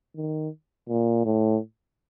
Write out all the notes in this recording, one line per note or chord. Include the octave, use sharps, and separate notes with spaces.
D#3
A#2
A2